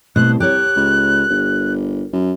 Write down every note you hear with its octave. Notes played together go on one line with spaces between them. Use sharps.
C2 B2 A3 C5 F#6
G4 A#4 C#5 F#6
C#2
G1
F#2